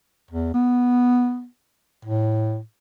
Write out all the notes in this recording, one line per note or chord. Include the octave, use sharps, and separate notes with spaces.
E2
B3
A2